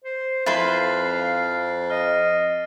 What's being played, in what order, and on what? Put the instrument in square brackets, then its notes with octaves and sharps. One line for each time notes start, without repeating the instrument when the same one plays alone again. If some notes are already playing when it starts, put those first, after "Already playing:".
[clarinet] C5
[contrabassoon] F2 [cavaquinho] E4 B4 C5 [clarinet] F5 [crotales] A6 C7
[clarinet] D#5 [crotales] F6